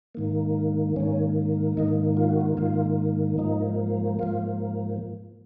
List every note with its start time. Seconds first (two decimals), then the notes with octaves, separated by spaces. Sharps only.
0.15 G#2 D#3 A#3
0.96 G#2 D#3 A#3 C#4
1.77 G#2 D#3 A#3 D#4
2.17 F4
2.29 F#4
2.41 F4
2.57 G#2 D#3 A#3 F4
3.38 G#2 F3 A#3 D#4
4.19 G#2 F3 A#3 F4